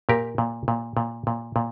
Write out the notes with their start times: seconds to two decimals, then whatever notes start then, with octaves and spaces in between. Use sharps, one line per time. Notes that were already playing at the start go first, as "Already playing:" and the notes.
0.09 A#2 G4 A#4
0.38 A#2
0.68 A#2
0.97 A#2
1.27 A#2
1.56 A#2